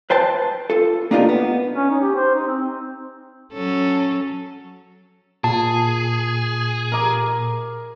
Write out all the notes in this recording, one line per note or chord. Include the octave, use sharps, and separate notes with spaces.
B4 C5 G5 A5
F4 A4
A#3 D4 D#4 F4 G4 A#4
B3
C#4
D#4
G4
C5
D#4
C4
F#3 C#4 A4
A#2 G#4 A5
A#4 D6